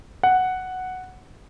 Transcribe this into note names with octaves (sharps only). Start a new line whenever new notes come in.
F#5